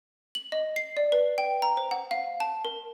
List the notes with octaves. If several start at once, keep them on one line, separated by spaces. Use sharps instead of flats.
F#7
D#5
C7
D5
B4
G5
A#5
C5
F#5
F5
A5
A#4